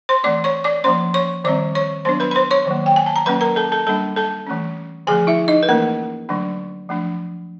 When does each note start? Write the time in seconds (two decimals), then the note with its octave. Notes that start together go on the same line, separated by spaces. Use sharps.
0.09 C5 C6
0.23 E3 A3 C4 D5 D6
0.44 C#5 C#6
0.64 D5 D6
0.84 F3 A#3 C#4 C5 C6
1.14 C#5 C#6
1.44 D#3 G3 C4 D5 D6
1.75 C#5 C#6
2.05 F#3 B3 D4 C5 C6
2.20 B4 B5
2.31 B5
2.35 C5 C6
2.51 C#5 C#6
2.66 D#3 F#3 A#3
2.86 G5
2.96 G#5
3.06 A5
3.16 A#5
3.26 F#3 A#3 C#4 B4 B5
3.41 A#4 A#5
3.56 A4 A5
3.72 A4 A5
3.87 G3 A#3 D4 A4 A5
4.16 A4 A5
4.47 E3 A3 C#4
5.07 D3 F3 A3 G#4 G#5
5.27 E4 E5
5.48 D#4 D#5
5.63 B4
5.69 E3 A3 A#3 C#4 A#4
6.29 D3 F#3 A3 D4
6.89 F3 A3 D4